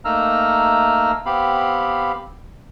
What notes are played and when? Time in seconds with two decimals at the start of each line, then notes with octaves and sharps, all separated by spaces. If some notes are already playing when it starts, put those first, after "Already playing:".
0.05 A3 A#3 D#4 A#5 E6 F6
1.26 B3 C4 G4 F5 B5